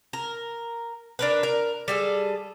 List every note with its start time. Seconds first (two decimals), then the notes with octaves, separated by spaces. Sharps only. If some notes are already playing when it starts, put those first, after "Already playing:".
0.13 A#4
1.19 D4 A#4 B4
1.43 A#4
1.88 G3 G#4 A4